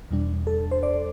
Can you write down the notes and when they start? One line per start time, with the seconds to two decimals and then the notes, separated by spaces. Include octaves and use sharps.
0.11 E2 B2 G3 D4
0.47 A4
0.71 C5
0.83 D5